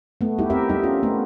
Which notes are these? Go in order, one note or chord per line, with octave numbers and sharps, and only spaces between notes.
A3 B3
G3 D#4 E4 G4
C4 G4 A#4 E5
G3 D#4
C#4 F4
A3 B3